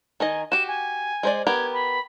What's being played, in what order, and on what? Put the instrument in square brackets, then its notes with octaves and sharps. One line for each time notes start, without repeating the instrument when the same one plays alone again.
[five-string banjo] D#3 D#4 D#5 [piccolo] G#5
[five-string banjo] F#4 G4 [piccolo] E7
[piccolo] G#5
[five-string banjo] G#3 C5 D5
[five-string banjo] B3 G4 A#4 [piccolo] G#6
[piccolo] B5